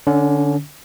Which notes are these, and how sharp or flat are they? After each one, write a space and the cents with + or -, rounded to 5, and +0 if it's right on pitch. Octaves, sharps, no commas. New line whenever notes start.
D3 +0 C#4 +25